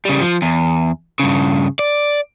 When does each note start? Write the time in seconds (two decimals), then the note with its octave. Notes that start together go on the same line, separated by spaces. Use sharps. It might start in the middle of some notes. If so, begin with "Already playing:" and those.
0.05 C#3 G3
0.21 F3
0.42 E2
1.20 G2 C#3
1.79 D5